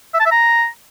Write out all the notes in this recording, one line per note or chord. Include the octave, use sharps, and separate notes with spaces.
E5
A5
E5
A#5